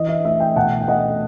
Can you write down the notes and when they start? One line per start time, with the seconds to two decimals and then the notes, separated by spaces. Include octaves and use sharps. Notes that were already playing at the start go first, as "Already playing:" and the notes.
Already playing: E3 D#5
0.09 E5
0.24 A3 E5
0.40 E5 G5
0.56 B2 F#5 A5
0.81 G5
0.88 A3 D#5 F#5